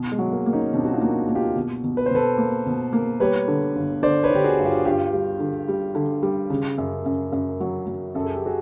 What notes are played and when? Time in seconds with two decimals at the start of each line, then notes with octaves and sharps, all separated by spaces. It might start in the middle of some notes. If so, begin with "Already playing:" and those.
Already playing: B2
0.12 G#3
0.19 F#3
0.32 G#3 A#3
0.46 A#3
0.53 C#4 D#4
0.73 B2 C4 D4
0.85 F#4
0.94 D#4 F4
1.01 A#3
1.28 A#3
1.35 F4 G4
1.56 B2
1.84 B2
1.97 B4
2.06 C5
2.11 B2 A4 B4
2.38 A#3
2.66 B2
2.93 A#3
3.20 G3 B4 C#5
3.48 D3
3.75 G1
4.02 D3 C5 D5
4.24 B4 C#5
4.30 D3 G4
4.44 F#4 G#4
4.58 G2
4.65 F4 G4
4.85 G2 F4 G4
5.13 G3
5.40 D3
5.68 G3
5.95 D3
6.23 G3
6.50 C#3
6.78 F#2
7.05 F#2
7.32 F#2
7.60 F#3
7.87 F#3
8.15 F#2 A4
8.25 G#4
8.36 G4
8.46 F#4 G#4